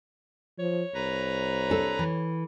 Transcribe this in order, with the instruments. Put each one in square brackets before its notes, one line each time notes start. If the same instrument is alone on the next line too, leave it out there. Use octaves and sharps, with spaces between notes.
[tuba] F3 [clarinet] C#5
[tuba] C2 [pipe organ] B4 A#5
[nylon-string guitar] D4 A4
E3